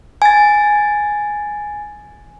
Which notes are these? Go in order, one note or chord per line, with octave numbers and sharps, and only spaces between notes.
G#5 A6